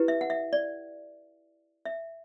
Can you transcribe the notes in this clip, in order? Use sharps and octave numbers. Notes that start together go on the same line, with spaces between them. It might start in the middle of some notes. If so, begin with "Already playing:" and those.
Already playing: E4 G4 B4
E5
F#5
E5
D5
E5